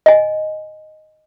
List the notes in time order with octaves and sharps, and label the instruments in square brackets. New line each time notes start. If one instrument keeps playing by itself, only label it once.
[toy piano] D#5 G#5